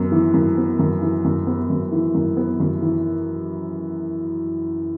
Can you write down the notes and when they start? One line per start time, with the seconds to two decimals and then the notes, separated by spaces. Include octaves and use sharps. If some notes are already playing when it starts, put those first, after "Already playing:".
Already playing: F#2 B3
0.12 E3
0.34 F#2
0.57 B3
0.79 F#2
1.01 E3
1.25 F#2
1.47 B3
1.70 F#2
1.92 E3
2.15 F#2
2.37 B3
2.60 F#2
2.82 E3